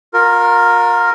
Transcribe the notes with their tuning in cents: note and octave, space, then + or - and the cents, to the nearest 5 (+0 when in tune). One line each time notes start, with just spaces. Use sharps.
F4 +35 A#4 +0